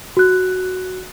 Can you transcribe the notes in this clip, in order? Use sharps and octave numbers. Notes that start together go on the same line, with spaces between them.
F#4 F#6